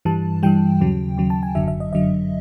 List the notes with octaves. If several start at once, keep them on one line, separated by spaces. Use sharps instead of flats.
G2 E3 G3 A5
G2 E3 G3 G5
D#2 C#3 F#3
D#2 C#3 F#3
A5
G#5
G1 F#2 D3 F#3 E5
E5
D#5
G1 F#2 D3 F#3 D#5